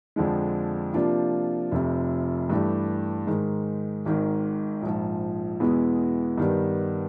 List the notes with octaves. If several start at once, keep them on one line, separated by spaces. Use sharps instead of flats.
F2 D3 F3 G#3
C3 F3 A#3 D4 F4
F1 F2 C3
G2 E3 A3 D4 G4
G#2 D#3 G#3
G#1 G#2 D#3
A#1 G#2 F3
E2 B2 G#3 B3 E4
G2 D#3 G3 B3